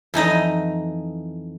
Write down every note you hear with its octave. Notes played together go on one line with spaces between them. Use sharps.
F2 E3 D#4 D#5